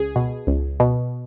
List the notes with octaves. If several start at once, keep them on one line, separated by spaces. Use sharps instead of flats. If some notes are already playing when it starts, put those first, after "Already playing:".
Already playing: C#2 G#4
B2
C#2
B2